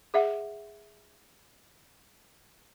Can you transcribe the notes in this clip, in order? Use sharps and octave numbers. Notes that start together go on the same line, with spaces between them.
G#4 E5 F#5